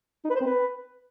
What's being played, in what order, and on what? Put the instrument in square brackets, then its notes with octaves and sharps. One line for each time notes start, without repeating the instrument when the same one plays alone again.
[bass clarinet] D#4
B4
C5
C4
B4